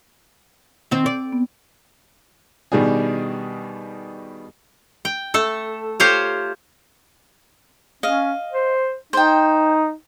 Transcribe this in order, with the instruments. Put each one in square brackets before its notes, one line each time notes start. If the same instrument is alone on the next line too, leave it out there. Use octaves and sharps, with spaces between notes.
[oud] D#3 C4
D5
[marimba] B3
[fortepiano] B2 D#3 G3 D4 G#4
[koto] G5
A3 A4
F4 G4 C5 C#5 F5
[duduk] C#4 [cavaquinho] D#5 F5
[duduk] C5
[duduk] D#4 [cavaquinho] C5 G5